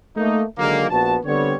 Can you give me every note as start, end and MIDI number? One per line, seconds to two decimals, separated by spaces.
0.17 0.42 57
0.17 0.42 58
0.17 0.42 63
0.59 0.85 50
0.59 0.85 51
0.59 0.85 54
0.59 0.85 56
0.59 0.85 58
0.90 1.17 34
0.90 1.17 59
0.90 1.17 66
0.90 1.17 81
1.25 1.54 50
1.25 1.54 55
1.25 1.54 59
1.25 1.54 60
1.25 1.54 73